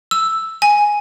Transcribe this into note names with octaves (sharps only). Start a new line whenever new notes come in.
E6
G#5